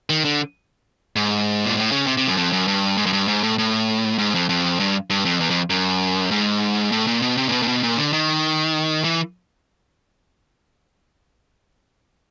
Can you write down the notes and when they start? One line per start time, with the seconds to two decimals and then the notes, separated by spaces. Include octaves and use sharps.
0.10 D#3
0.24 D3
1.16 G#2
1.66 A#2
1.77 A2
1.91 C#3
2.07 C3
2.17 C3
2.27 F#2
2.37 F2
2.53 F#2
2.68 G2
2.97 G#2
3.06 F#2
3.13 G2
3.28 G#2
3.43 A2
3.58 A2
4.18 G#2
4.34 F2
4.49 F2
4.80 G2
5.10 G2
5.25 F2
5.40 E2
5.50 F2
5.70 F#2
6.31 G#2
6.92 A2
7.07 A#2
7.22 B2
7.37 C3
7.49 A#2
7.52 B2
7.62 A#2
7.67 B2
7.83 A#2
7.97 D3
8.13 D#3
9.04 E3